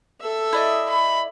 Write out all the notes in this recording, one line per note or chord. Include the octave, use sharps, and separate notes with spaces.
A4 E5
E4 D5 D#5
B5